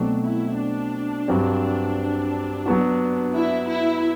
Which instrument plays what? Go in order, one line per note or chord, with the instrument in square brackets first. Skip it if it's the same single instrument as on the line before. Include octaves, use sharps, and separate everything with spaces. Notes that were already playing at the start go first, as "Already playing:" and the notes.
Already playing: [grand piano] B2 F#3 A3 C4 F#4 [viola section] D4
[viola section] E4
D4
[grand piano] G2 F#3 C4
F#3 B3 F#4
[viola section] E4
E4